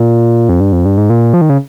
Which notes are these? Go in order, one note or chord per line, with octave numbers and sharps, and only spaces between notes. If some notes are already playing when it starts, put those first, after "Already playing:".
Already playing: A#2
F2
G2
F2
G2
G#2
A#2
F3
D#3
C#3